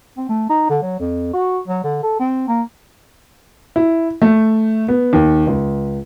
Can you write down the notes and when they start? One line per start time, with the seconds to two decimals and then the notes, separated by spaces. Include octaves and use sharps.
0.17 C4
0.29 A3
0.49 D#4
0.70 D3
0.82 F#3
0.99 F2
1.33 F#4
1.68 F#3
1.84 D3
2.03 A4
2.20 C4
2.48 A#3
3.76 E4
4.22 A3
4.88 B3
5.13 D#2
5.47 C#2